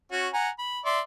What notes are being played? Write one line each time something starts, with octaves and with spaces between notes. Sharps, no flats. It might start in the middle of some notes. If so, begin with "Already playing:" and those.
C#4 F#4
F#5 G#5 A#5
B5
D5 E5 C6